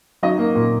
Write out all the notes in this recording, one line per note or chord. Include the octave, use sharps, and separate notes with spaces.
F#3 D#4 D#5
A#3
A#2